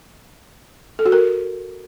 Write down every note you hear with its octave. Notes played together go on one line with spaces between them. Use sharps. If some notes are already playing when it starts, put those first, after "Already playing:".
A4
F#4
A#4